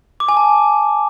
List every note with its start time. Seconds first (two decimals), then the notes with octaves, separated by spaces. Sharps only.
0.20 D6
0.29 G#5
0.37 A5